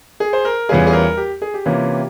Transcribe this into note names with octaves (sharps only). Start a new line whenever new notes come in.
G#4
C5
A#4
E2 E3 G3 C#4 F4 G#4
G#4
A#4
G4
G#4
G4
C3 E3 A#3 C#4 F4